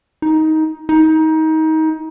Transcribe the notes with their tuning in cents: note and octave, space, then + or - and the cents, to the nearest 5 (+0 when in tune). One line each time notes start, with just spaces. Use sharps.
D#4 +15
D#4 +25